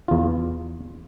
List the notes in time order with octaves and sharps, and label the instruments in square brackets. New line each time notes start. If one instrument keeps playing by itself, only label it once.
[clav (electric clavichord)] E2 F4